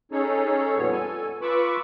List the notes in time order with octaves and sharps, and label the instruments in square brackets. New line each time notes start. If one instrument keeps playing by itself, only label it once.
[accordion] C#4 D#4 G#4 A4 C#5
F2 A#2 G3 B3 C#5
A4 G#5
F4 B4 B5 C#6 D6 E6